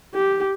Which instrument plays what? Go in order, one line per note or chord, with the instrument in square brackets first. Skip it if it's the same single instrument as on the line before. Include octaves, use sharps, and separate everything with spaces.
[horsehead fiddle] G4